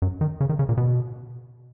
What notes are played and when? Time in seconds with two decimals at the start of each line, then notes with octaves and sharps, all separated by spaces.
0.02 F#2
0.21 D#3
0.41 C#3
0.49 D#3
0.59 C#3
0.69 A#2
0.77 B2